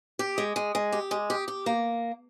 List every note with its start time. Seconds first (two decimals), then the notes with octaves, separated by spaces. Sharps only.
0.19 G4
0.38 G#3
0.56 G#3
0.75 G#3
0.92 G4
1.11 G#3
1.30 G4
1.48 G4
1.66 A#3